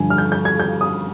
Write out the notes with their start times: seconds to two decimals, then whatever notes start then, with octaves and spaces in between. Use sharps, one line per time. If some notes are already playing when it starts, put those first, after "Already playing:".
Already playing: G2 D3 F3 G#5
0.10 F6
0.18 G6
0.32 G6
0.45 G#6
0.60 G6
0.81 D#6